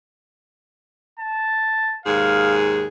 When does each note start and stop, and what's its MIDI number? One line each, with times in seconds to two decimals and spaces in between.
1.19 1.98 81
2.06 2.86 39
2.06 2.86 44
2.06 2.86 68
2.06 2.58 77